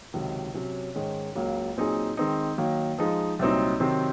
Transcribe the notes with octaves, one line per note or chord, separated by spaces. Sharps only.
C#2 C3 D#3 F#3
C3 F#3 C#4
G#2 D#3 G#3 C#4
C#2 C#3 F#3 A#3
A#2 F#3 C4 D#4 G#4
D#3 G#3 C4 D#4
D#3 F#3 A#3
F3 G#3 D#4
C2 A#2 F#3 C4 D#4
C3 D#3 F#3 C4